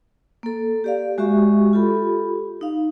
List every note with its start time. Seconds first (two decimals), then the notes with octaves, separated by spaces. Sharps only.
0.43 A#3 A4
0.84 G4 D5 F5
1.18 G#3 F#4 G4 E5 C#6
1.73 F4 G4 A4 B5
2.61 D#4 F5